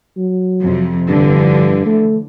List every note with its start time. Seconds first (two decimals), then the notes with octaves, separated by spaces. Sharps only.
0.17 F#3
0.62 F2 C3
1.09 G2 D3 E3 F3
1.86 A3